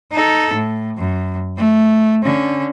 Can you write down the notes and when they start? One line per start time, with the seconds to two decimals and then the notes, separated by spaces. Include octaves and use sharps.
0.11 D#4 A4
0.54 A2
0.97 F#2
1.57 A3
2.23 D3 C#4